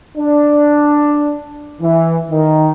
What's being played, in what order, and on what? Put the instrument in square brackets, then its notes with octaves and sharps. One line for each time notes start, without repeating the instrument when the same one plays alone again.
[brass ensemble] D4
E3
D#3